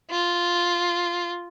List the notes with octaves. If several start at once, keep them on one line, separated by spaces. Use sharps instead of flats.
F4